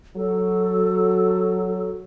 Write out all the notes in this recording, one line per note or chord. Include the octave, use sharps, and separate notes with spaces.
F#3 A4